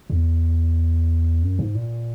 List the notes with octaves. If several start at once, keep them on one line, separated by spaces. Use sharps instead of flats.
E2
F#2
G#2
A#2